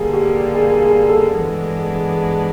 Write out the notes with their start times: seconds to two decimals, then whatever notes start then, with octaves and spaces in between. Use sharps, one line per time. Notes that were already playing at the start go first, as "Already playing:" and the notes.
Already playing: D3 G3 A#3 G#4
0.13 G4
0.54 G#4
0.81 G#4
1.09 A4
1.36 G2 E3 G#3 B3 D4